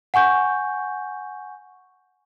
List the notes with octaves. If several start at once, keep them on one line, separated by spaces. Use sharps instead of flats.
F#5 G#5 C#6 G6